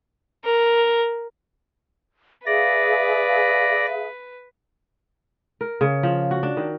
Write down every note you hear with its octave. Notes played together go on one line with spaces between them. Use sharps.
A#4
G#4 B4 D5 E5 F5 A#6
A#4
C#3
F3
F#4
D4
D#3